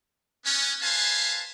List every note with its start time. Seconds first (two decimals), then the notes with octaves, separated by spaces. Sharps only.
0.45 B3 C#4
0.82 B4 C5 F5 G#5 A5